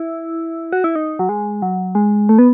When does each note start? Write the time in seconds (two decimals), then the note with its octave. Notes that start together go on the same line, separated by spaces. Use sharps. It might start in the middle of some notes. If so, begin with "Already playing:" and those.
Already playing: E4
0.73 F#4
0.84 E4
0.96 D#4
1.19 F#3
1.29 G#3
1.62 F#3
1.95 G#3
2.29 A3
2.38 B3